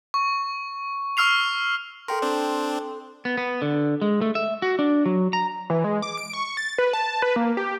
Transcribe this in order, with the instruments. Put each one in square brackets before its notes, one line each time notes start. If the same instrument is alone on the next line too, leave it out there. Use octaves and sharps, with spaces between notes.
[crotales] C#6
C#6 E6 F6 C7 F7
[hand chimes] A4 G5 C6 [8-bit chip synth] A#4
[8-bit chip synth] C4 D4
[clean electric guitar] B3
B3
D3
G#3
A3
E5
F#4
D4
F#3
A#5
[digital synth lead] E3
G#3
D6
D7
C#6
A6
B4
A5
B4
A#3
G4